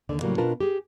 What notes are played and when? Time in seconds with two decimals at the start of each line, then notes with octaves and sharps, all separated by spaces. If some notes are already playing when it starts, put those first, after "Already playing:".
0.09 D#2 D3 D5
0.22 A2 C#3 F#3 G3 A#3
0.38 B2 D4 F4 A#4 B4 A5
0.60 G4 G#4